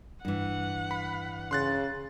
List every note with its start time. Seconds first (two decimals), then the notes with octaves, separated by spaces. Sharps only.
0.25 G2 E3 F#5
0.91 B5
1.51 C#3 C6 F#6 A6